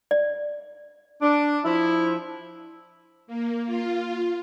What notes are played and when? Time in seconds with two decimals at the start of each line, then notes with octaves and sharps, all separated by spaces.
0.11 D5
1.22 D4
1.65 F3 E4
3.27 A#3
3.66 F4